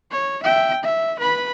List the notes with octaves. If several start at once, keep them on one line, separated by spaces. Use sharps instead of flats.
C#5
E5 G5
E5
B4 B5